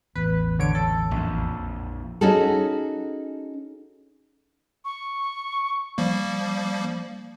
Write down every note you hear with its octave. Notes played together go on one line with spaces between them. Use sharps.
A1 E2 B4
D3 C#5 D7
A4
A#1 F2
C#4 D#4 F#4 G#4 A4
C#6
F3 G3 A#3